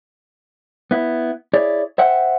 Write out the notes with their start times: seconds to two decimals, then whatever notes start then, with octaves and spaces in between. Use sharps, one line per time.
0.91 B3 E4
1.53 E4 G#4 C#5 D5
1.98 C5 E5 F#5 G5